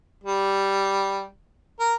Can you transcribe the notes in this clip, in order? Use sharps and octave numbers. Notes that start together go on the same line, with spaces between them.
G3
A#4